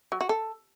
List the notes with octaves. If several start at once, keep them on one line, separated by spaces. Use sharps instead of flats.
F#3
F#4
A4